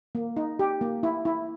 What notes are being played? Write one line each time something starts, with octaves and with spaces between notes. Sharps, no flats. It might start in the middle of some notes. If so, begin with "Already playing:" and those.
A#3
D#4
G4
A#3
E4
E4